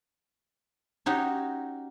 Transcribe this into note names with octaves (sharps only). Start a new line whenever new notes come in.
C#4 D#4 F#4 G4